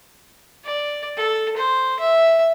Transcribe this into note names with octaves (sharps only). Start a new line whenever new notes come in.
D5
A4
C5
E5